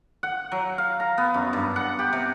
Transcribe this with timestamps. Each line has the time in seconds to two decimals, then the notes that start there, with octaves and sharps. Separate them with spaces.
0.23 F#5
0.52 F#3
0.78 F5
1.00 A#5
1.18 B3
1.34 F#2
1.53 G2
1.76 F#5
1.99 G4
2.13 C3